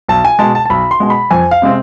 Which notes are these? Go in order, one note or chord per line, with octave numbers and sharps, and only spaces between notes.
B1 A5
G#5
B2 G#3 A5
A5
A5
B1 B5
C6
B2 G#3
B5
F2 G#5
F5
C3 G#3 C4